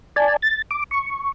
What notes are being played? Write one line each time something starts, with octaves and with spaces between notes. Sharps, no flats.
D5 G#5 A5
A6
D6
C#6